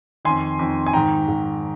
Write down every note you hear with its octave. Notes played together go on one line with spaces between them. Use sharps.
F2 D#3 G#5 C6
F2 D#3
G#5
G#2 D#3 G5 A#5
G#2 D#3